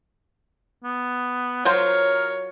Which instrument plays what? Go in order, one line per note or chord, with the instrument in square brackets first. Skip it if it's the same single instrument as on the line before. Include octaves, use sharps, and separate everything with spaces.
[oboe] B3
[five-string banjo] F#3 F4 C5 [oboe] A#4 [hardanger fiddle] C#5